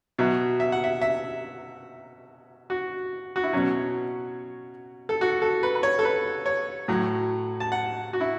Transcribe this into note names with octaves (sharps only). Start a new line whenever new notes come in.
B2 F#3 E5
E5
F#5
E5
E5
F#4
F#4
E4
B2 F#3 C#4
A4
F#4
A4
B4
B4
C#5
A4
B4
C#5
A2 F#3
A5
F#5
F#4
E4